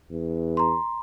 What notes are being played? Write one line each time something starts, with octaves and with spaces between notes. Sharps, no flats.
E2
A#5 C6